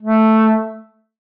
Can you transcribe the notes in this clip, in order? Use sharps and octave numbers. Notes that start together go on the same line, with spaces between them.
A3